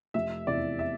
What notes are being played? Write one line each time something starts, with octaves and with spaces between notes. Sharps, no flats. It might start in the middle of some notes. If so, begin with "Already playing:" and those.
F1 E5
E2 C3 E3 D5
E5